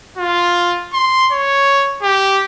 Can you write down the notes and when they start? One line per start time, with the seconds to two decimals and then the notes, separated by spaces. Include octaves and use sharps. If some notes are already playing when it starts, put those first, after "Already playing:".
0.17 F4
0.93 C6
1.32 C#5
2.03 G4